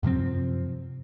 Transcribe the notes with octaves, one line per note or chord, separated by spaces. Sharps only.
F#2 C3 F3 C4